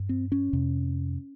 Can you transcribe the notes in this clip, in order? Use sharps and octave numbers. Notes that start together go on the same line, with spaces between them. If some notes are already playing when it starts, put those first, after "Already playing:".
Already playing: G2
C4
C#4
F2 C3